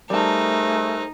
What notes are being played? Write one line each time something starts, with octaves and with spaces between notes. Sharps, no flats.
G3 A3 D#4 G#4 A#4 C5 A5